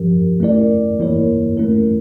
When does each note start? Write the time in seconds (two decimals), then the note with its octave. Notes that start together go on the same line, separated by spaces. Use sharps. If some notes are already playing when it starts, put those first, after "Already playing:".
Already playing: F3 C#4 G4 A#4
0.40 A3 C#4 E4 A#4 D5
0.99 E3 A#3 E4 A#4 C#5
1.57 E3 A3 C#4 E4 A#4